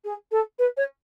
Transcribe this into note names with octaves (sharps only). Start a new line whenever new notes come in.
G#4
A4
B4
C#5